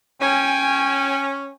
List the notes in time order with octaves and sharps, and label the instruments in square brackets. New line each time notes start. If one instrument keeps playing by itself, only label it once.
[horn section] C#4 [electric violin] G5 G#5